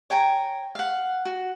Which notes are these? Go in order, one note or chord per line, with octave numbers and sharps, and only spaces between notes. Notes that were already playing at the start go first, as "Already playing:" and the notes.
C#5 G5 G#5 A#5
F5 F#5
F#4